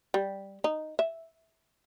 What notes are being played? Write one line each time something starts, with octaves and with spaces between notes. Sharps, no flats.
G3
D#4
E5